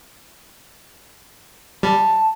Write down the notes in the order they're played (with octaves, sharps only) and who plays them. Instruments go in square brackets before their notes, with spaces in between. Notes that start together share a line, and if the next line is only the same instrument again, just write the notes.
[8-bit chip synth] G3 [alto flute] A5